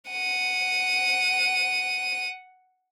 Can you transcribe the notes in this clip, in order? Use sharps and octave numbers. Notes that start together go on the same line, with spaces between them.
F#5 D#7